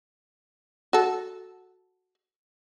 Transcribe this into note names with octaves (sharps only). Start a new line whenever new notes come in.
F#4 A4